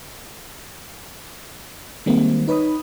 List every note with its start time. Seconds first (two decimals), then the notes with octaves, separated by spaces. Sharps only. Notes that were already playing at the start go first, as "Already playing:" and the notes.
2.06 D#3 G3 G#3 A#3 C4
2.48 D#4 B4 C#5 B5 D#6